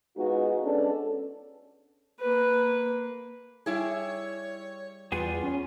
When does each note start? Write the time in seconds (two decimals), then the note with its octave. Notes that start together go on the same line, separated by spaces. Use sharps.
0.17 G#3 B3 D#4 F4 F#4
0.63 G#3 B3 C#4 D4 A4
2.20 A#3 B4
3.66 G3 E4 G#4 C#5
5.12 E2 G3 B3 F4 G#4
5.43 C#4